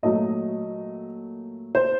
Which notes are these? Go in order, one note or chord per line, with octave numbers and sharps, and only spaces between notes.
A#2 F#3 A3 D#5
C5